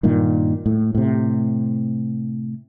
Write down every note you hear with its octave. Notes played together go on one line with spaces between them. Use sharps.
G2 A#2 D#3
A2
A2 C3